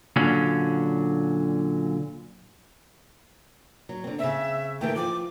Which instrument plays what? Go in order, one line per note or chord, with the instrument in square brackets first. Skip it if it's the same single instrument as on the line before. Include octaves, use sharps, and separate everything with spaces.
[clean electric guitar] A#2 D3 F#3 C#4
[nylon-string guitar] F#3
D3 C4
[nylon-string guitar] C#3 C4 [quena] E5
[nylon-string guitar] D#3 E3 A3 [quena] G5
[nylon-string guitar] F3 [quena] D6